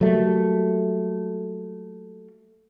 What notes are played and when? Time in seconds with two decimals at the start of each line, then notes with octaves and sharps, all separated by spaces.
0.01 F#3 G3 A3 A#3